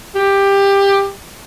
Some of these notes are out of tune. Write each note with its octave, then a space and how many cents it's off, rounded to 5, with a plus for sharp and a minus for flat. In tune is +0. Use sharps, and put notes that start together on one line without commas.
G4 +15